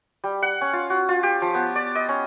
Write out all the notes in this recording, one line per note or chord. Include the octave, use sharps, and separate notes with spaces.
G3
F#5
C#4
F4
F#4
F4
G4
F3
B3
D5
D#5
C#4